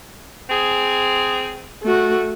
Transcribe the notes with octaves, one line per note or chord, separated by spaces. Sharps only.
C4 G#4
A3 F#4